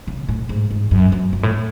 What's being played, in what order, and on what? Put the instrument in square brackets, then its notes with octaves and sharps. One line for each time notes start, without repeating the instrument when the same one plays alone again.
[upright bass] C#3
A2
G#2
G#2
F#2
F#2
F#2
A2